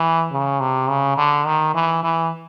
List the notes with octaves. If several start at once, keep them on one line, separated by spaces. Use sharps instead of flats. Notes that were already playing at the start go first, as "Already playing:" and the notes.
Already playing: E3
C#3
C3
C#3
D3
D#3
E3
E3